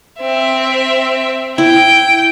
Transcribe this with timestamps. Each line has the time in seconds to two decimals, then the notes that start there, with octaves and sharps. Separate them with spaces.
0.21 C4 E5
1.58 E4 G5